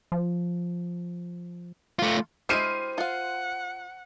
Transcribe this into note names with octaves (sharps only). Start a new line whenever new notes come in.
F3
A3 F4
G#3 E4 G4 C5 F6 C7 D#7
F4 F5 F#5